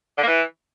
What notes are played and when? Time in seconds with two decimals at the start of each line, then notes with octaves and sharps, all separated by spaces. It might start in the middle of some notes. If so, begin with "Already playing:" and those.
0.17 D3
0.22 A#3
0.27 E3